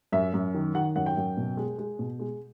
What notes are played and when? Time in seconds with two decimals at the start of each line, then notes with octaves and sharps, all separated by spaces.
0.12 F#2 E5
0.34 F#2
0.54 D#3
0.75 D#3 F#5
0.96 F#2 F#5
1.06 G5
1.17 F#2
1.37 B2
1.57 G#3
1.78 G#3
1.99 B2
2.19 G#3